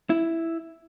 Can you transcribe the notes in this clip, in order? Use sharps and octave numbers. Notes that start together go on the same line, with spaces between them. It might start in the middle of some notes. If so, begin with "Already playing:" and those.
E4